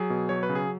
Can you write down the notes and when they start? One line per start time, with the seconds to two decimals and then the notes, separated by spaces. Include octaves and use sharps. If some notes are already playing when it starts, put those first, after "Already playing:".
Already playing: F#3 G#4
0.10 B2
0.29 F#3 C#5
0.43 B4
0.49 C#3
0.55 G#4